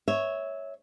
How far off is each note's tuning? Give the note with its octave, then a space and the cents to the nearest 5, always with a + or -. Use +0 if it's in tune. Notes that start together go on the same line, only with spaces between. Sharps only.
C#5 +0 E5 -15